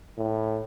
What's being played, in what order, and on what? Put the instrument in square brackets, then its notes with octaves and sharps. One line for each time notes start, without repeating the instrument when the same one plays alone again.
[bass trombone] A2